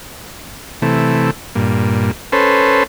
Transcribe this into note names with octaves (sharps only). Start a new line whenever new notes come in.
C3 E3 A3
G2 A#2
C#4 A4 B4 C5